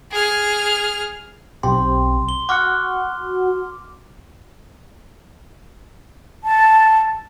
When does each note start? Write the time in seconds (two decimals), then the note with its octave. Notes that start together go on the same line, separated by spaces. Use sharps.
0.11 G#4 F6
1.63 B1 C4 G4 C6
2.29 G7
2.49 F#4 F#5 D6 F6
6.44 A5